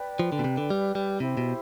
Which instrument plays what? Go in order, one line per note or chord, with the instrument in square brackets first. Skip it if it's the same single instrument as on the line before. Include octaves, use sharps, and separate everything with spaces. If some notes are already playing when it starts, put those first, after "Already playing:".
Already playing: [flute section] B4 D5 G5
[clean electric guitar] F3
D3
B2
C3
D3
G3
G3
[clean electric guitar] C3 [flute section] E4 G4 C5
[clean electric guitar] B2